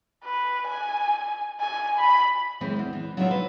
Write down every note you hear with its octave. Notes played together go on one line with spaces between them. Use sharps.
B4
G#5
G#5
B5
F#2 E3 G#3 C4
E2 D4
E3
F#3 D4 D#4 F4 C#5 E5
B4